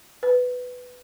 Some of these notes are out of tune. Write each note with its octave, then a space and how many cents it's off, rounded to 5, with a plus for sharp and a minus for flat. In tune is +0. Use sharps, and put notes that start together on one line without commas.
B4 +10